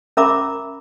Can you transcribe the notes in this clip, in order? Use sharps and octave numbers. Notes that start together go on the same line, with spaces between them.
C#4 A#4 E5 A#5 B5 D6